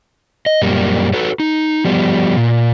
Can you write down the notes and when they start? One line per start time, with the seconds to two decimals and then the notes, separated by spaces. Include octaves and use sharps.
0.46 D#5
0.62 F#2 A#2 G3 A#3
1.13 F#4 A4 B4
1.40 D#4
1.85 F3 G3 B3
2.37 A#2